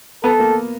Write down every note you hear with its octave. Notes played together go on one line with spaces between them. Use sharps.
B3 A4
A#3